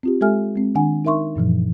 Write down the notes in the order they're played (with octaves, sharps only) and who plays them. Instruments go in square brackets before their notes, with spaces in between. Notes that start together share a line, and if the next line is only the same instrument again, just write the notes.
[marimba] C4 F4 G4
G#3 G4 A4 E5 G#5 F6
G#3 C4
D#3 D4 F#5 G#5
D#4 A#4 E5 C6 C#6
F#2 A#2 E3 F3